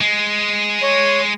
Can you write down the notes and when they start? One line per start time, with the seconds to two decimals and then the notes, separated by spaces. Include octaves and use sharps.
0.01 G#3
0.83 C#5